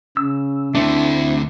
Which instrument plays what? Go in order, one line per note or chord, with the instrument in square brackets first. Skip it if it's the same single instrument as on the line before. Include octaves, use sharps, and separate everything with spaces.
[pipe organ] C#3 [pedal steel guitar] E6
[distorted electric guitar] D2 A3 [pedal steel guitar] C4 D4 [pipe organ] E4